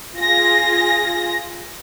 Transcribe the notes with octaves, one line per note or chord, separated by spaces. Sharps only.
F4 G#4 A#6